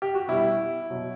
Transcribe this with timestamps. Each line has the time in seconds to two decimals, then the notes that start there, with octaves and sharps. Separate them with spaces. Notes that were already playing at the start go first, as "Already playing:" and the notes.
0.02 G4
0.15 F#4
0.28 B2 G3 E4
0.90 B2 F#3